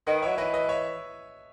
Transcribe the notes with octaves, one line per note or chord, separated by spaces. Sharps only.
D#3 B4 D#5
F#3 C#5 E5
E3 B4 D#5
B4 D#5
C#5 E5